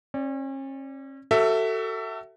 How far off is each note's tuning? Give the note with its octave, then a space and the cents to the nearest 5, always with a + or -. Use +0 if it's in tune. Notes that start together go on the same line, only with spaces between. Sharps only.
C#4 -40 D5 -10
F#4 +35 A4 +25 E5 +0